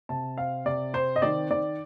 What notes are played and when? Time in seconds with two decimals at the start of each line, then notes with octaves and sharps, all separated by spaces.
0.09 C3 A5
0.38 C4 F5
0.65 C3 D5
0.93 C4 C5
1.16 D#5
1.22 D#3 D5
1.50 D#3 D5